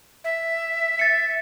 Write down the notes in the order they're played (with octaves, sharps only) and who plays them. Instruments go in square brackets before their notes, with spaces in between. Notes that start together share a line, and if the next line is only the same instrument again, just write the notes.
[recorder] E5
[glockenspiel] A6 C#7